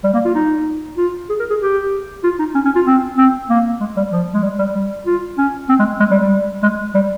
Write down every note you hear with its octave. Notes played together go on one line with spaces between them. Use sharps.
G3
A#3
F4
D#4
F4
G#4
A#4
G#4
G4
F4
D#4
C#4
C#4
F4
C4
C4
A#3
G#3
G3
F3
G#3
G3
G3
G3
F4
C#4
C4
G#3
G#3
G3
G3
G#3
G3